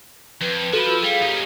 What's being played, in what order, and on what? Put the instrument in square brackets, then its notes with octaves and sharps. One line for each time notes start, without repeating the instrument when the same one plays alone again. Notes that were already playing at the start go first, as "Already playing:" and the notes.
[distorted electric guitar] F2 [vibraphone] B4
[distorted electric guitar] F3 [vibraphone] F#4 B4 B5 [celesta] A4
[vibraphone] F4 E6
[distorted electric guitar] G3 [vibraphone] G#4 F5
[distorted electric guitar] C#4 D#4 [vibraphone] G4